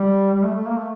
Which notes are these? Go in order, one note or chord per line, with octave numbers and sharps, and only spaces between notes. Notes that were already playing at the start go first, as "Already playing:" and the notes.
Already playing: G3
G3
A3
A3
A#3
A3